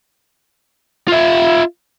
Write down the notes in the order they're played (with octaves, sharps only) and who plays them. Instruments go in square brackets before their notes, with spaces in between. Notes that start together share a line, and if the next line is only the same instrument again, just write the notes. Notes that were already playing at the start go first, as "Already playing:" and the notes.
[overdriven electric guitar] F4 E5